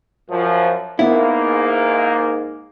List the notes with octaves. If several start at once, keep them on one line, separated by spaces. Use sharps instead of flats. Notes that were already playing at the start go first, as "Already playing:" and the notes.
F#2 F3
G#2 A#3 B3 E4